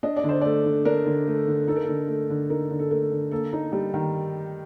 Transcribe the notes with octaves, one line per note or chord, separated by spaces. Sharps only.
D4 D#5
D5
D3
C5
A3 D5
D3
D4 A#4
D3
A3
D3
D#4 A4
A#4
D3 A4
A3
D3
D#4 A#4
D3
A4
A3 A#4
D3
A#3 A4
D#4
G3
D#3